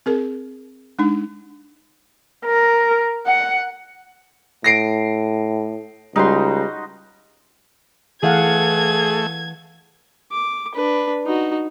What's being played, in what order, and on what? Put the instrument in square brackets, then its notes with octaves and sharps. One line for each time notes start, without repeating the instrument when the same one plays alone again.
[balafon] C4 G#4 A#4
G#3 D4 D#4
[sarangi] A#4
F#5
[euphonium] A2 [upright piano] A#6 C7 D7
[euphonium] C#2 [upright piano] G3 [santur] D#4 F#4 C6
[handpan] E3 F5 F#5 [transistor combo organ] A3 [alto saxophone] G#4 [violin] G#6
[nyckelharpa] D6
D4 B4
D#4 F#4